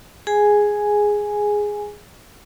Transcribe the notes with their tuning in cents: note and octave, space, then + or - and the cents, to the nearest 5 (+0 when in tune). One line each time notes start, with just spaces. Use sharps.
G#4 +0 G#5 +0